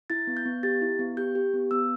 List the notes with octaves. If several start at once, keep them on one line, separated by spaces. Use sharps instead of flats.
E4 A6
B3
G6
B3
G4 A6
E4
B3
G4 G6
G4
B3
B3 E6